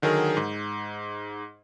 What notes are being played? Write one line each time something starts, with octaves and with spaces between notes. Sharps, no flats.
D3 D#3 F#3 G#4 A#4
G#2